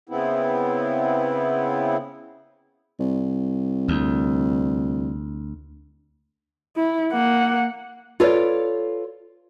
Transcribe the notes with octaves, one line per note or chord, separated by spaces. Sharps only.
C#3 B3 C4 E4
C2
D2
E4
A#3 F#5
F4 A4 B4 C#5 D5